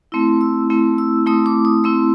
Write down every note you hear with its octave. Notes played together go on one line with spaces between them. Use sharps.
A3 C4 E4
E6
A3 C4 E4
E6
A3 C4 E4 D#6
D6
D#6
A3 C4 E4 E6